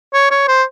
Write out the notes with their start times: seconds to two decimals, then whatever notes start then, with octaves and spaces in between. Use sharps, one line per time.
0.14 C#5
0.31 C#5
0.48 C5